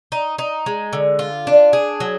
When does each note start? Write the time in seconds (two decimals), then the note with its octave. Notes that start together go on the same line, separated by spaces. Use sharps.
0.12 D#4
0.38 D#4
0.66 G#3
0.93 D3
1.19 F4
1.47 D4
1.73 G#4
2.00 F#3